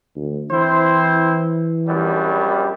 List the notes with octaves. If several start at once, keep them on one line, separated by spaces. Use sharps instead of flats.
D2
E3 C4 E4 C5
A#1 F#2 G3